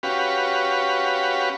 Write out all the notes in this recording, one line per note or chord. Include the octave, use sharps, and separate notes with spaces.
C#4 F#4 G4 B4 F5